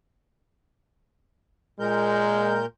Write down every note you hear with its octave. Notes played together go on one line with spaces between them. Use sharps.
A#2 G#3 A#4 G6